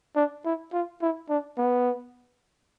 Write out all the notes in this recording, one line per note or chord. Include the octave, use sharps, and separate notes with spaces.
D4
E4
F4
E4
D4
B3